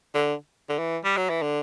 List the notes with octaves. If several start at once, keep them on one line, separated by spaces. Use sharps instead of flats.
D3
D3
E3
G3
F#3
E3
D3